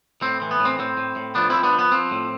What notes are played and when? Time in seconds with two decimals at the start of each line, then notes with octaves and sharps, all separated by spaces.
0.22 A2 C4
0.42 E3
0.51 B3
0.60 A2
0.65 C4
0.79 A2 C4
0.97 A2
1.16 A2
1.35 F3 B3 D4
1.50 F3 C4 E4
1.63 B3 D4
1.73 F3
1.79 B3
1.92 F3 C4
2.11 A2